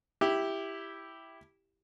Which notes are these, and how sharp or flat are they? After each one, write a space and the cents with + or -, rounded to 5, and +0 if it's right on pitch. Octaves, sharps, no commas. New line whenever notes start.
E4 +0 G4 +0